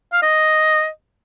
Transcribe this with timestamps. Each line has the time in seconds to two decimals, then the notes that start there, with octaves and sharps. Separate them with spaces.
0.13 F5
0.23 D#5